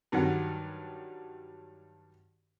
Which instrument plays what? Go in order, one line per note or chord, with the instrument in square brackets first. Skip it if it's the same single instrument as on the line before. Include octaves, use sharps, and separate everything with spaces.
[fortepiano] G2 D#3 F#3 G3 F#5